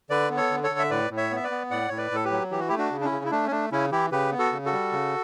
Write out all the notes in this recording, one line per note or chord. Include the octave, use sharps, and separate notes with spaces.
D3 B4 D5
B3
A4 C#5
D3
A4 C#5
D3
E5
A2 B4 D5
A2
C#5 E5
B3
E5
B4 D5
B3
A2 D5 F#5
A2 C#5
B4 D5
A2 A4
G4 B4
F#3
E3 G4
F#4
E4 G4
A3
D4 F#4
C#3
D4
C#4 E4
C#3
E4
A3 D4
C#4
A3 D4
C#3 C#4 E4
E3 E4 G4
C#3 G4 B4
B3
F#4 A4
C#3
F#4 A4
G3
C#3